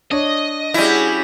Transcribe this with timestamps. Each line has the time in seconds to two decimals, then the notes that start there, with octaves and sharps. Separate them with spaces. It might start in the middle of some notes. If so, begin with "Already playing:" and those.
0.11 D4 C#5 D#5
0.74 G3 C#4 E4 F#4 G#4